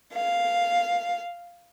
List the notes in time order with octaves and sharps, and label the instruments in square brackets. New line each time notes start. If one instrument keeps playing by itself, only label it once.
[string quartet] F5